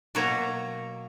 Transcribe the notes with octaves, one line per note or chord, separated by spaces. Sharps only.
B2 F#3 A#3 C#5 A#5